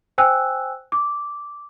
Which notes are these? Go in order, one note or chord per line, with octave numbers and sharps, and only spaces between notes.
C5 G5 G#5 E6 F#6
D6